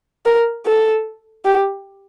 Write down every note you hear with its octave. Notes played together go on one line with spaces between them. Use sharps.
A#4
A4
G4